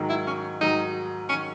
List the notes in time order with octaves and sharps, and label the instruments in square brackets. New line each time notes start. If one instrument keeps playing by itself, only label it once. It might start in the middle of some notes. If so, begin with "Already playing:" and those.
Already playing: [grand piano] G#2 D#3 F#3
[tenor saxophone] E4
C#4
[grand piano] G#2 D#3 F#3 [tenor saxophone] D#4
[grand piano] D#3 F#3 [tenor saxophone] C#4